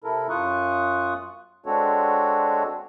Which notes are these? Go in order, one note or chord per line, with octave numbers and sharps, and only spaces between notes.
C3 E4 A4 A#4
F#2 F4 C#6 D#6 F#6
G#3 C4 D4 F#4 A4 C#5